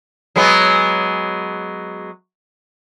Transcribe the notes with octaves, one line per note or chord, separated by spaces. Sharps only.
F#3 G#3 B3